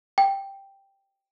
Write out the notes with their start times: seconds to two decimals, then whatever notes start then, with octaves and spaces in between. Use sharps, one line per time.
0.18 G5